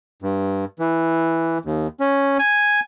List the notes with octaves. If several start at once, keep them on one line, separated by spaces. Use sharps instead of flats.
G2
E3
D#2
C#4
G#5